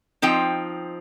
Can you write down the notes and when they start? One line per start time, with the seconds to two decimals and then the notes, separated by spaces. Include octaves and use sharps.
0.22 F3 C4 D#4 G5